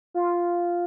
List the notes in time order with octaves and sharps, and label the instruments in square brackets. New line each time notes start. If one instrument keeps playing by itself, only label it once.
[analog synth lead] F4